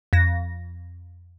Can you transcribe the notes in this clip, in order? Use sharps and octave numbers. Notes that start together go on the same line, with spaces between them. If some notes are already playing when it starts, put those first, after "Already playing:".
F2 A#6